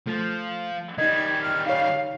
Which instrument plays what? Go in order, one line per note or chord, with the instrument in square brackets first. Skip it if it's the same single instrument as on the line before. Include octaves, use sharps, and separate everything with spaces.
[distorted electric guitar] F3 [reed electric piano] A3
[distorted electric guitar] D#3 G3 [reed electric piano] D#4 D#5 [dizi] G#6
[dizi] F6
[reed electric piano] D#4 C#5 [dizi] F5